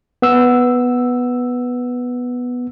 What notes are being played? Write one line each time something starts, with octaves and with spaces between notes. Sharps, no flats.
B3 E6